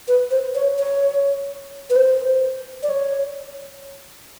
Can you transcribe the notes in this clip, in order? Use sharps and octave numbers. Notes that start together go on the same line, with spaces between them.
B4
C5
C#5
C#5
B4
C5
D5
C#5